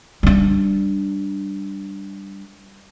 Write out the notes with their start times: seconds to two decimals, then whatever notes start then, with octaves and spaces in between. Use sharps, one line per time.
0.23 G3 D4